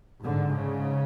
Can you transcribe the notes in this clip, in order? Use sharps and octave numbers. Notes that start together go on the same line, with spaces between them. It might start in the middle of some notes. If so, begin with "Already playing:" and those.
G#2 D3
C#3